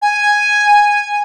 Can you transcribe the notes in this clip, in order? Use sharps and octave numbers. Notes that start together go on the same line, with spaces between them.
G#5